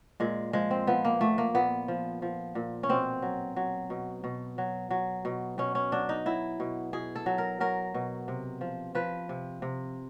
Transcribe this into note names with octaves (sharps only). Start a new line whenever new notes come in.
A#2 G#3
F3 G#3
C4
F3 B3
A#3
A#2 A3
A#3
A#2 B3
F3
F3
A#2
C#4
B2 C4
F#3
F#3
B2
B2
F#3
F#3
B2
B2 C#4
C#4
F#3 D4
D#4
F#3 E4
B2
B2 G#4
A4
F#3
A#4
F#3 A#4
B2
C3
F3
F3 B4
C3
C3